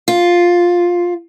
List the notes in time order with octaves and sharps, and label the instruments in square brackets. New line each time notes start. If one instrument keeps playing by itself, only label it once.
[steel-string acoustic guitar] F4